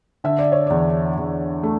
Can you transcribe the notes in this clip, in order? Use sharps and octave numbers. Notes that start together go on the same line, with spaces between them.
D3 E5
D5
C#5
E2 D5
E2
A3